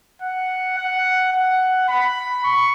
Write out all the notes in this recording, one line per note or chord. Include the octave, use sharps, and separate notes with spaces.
F#5
F#5
F#5
B5
C#6